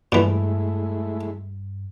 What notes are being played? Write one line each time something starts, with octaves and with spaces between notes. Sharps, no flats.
G2 A#2 E3 G#3 A3 E4